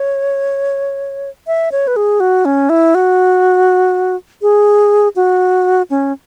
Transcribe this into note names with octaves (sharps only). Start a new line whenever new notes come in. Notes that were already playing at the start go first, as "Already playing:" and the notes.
Already playing: C#5
E5
C#5
B4
G#4
F#4
C#4
E4
F#4
G#4
F#4
C#4